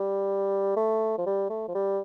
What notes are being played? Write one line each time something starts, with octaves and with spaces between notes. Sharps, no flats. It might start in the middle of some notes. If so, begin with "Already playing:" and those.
Already playing: G3
A3
F3
G3
A3
F3
G3